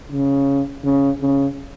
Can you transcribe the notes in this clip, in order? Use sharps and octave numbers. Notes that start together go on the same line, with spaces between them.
C#3
C#3
C#3